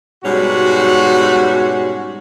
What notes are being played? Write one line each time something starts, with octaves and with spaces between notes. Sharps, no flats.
G#2 B2 G3 C#4 F#4